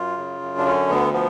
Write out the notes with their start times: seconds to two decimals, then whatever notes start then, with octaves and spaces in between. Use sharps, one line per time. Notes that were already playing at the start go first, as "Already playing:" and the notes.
Already playing: F#2 F4
0.17 C#3
0.41 F#2
0.58 D4
0.66 D3 C#4
0.89 D2 B3
1.14 F3 B3